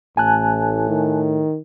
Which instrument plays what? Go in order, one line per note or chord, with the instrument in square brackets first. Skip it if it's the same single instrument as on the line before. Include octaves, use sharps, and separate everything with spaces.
[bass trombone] A1 [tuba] A2 [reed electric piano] G#5 A5 F#6
[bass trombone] D#3